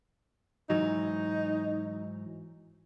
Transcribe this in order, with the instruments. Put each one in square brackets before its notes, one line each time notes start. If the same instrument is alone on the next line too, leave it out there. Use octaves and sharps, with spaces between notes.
[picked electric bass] G#2 E3 F#3 [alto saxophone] D#4